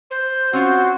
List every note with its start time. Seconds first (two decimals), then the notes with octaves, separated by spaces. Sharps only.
0.10 C5
0.53 C4 C#4 F4 F#4